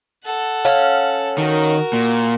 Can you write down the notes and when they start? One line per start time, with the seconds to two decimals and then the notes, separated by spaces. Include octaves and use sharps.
0.24 A4 F#5
0.65 C#4 F5
1.38 D#3 F#4 A#4
1.93 A#2